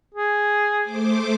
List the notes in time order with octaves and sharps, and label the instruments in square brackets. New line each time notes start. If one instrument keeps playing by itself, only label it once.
[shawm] G#4
[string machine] A3 C5 D6